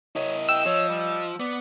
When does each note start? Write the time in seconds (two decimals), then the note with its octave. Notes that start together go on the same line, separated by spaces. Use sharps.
0.16 E4 A#4 C#5 D#5
0.49 G5 E6
0.66 F3 C#5
0.89 G3
1.40 B3 D5